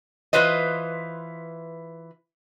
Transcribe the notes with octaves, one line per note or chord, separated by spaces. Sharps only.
E3 F4 B4 C5 D#5